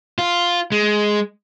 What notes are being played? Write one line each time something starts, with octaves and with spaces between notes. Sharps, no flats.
F4
G#3